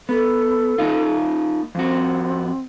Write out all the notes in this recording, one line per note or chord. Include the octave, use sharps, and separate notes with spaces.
B3 A4
A#3 D#4 F4
F2 C4 F#4